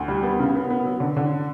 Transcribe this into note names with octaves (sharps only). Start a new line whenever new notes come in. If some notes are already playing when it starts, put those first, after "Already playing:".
Already playing: D2
G3
B3
C#3
B3
B3
F#3
D3
D3